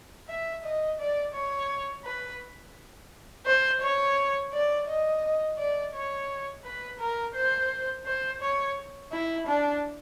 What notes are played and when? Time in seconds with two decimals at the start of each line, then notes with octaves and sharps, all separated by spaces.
0.28 E5
0.64 D#5
0.99 D5
1.34 C#5
2.05 B4
3.46 C5
3.82 C#5
4.53 D5
4.87 D#5
5.58 D5
5.94 C#5
6.64 B4
6.99 A#4
7.35 C5
8.06 C5
8.42 C#5
9.12 E4
9.47 D4